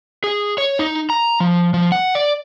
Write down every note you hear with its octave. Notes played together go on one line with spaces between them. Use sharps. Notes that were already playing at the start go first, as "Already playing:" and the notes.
G#4
C#5
D#4
A#5
F3
F3
F#5
D5